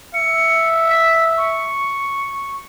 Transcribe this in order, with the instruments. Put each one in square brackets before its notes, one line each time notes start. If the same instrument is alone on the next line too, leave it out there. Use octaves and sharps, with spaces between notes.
[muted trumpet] E5 [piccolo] C#7
[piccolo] B6
C#6